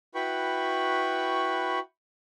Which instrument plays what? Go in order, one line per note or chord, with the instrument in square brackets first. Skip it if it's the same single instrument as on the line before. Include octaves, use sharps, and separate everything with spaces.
[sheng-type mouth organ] E4 F#4 B4 G5 B5 C#6